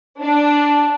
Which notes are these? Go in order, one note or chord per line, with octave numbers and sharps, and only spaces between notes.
D4